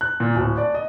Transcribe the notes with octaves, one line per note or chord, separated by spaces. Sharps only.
F#6
A#2
D1
D5
D#5